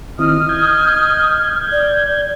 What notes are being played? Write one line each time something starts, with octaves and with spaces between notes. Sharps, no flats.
D#3 C4 E4 D#5 D#6 F6
G6 G#6
D5